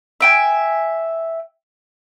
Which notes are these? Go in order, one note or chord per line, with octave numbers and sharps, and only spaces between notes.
E5 G5 G#5